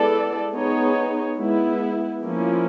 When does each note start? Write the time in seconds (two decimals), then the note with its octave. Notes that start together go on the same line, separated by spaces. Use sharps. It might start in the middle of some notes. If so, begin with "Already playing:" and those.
Already playing: G#3 B3 E4 A4 D5
0.52 B3 D#4 G#4 C#5
1.38 G#3 B3 E4
2.24 F3 A#3 C#4 E4